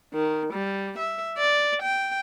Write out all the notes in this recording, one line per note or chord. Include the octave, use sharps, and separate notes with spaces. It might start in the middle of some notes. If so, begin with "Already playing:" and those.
D#3
G3
E5
D5
G5